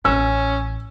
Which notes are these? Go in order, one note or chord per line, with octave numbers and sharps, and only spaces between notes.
A1 C#4 E6